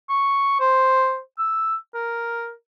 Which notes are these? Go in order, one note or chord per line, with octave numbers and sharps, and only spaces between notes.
C#6
C5
E6
A#4